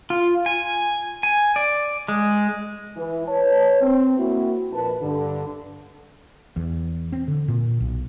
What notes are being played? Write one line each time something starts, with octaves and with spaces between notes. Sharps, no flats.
F4
G#5
G#5
D5
G#3
E3
B4 C#5 A5
C4
A#3 E4 F#4
A#1 B4 A5
G2 D3
E2
C4
D3
A#2
B1